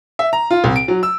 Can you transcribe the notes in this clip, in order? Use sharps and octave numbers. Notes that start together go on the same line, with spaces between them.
E5
A#5
F4
C2
D7
F#3
E6